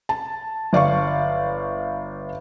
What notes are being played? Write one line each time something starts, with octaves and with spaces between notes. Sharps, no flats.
A5
G1 D5 F5 C#6